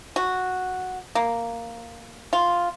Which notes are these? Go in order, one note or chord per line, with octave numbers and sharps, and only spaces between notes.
F#4
A#3
F4